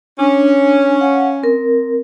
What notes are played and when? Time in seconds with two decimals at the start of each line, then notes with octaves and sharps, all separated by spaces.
0.19 C#4 D4
1.01 F5 F#5
1.43 C4 A#4